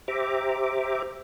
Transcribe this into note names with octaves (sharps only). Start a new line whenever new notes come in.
G4 C5 E5 A#5 D6